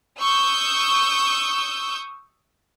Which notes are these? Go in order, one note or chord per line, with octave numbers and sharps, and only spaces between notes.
C#6 D#6 E6 G6